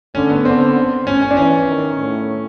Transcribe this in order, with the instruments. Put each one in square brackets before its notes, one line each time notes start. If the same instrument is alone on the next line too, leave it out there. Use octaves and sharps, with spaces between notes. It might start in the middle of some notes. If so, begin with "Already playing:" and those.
[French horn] D3 [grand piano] C#4
[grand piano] B3
[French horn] D3 [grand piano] C4
[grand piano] C#4
C#4
D4
[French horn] E3 [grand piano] C#4
[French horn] D#3
A2